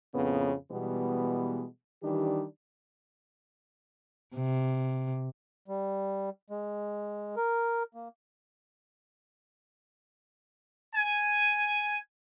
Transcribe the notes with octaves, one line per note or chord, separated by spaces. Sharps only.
F2 A2 C#3 B3
B2 E3 G3 G#3 B3
D#3 E3 G3 D4 G4
C3
G3
G#3
A#4
A#3
G#5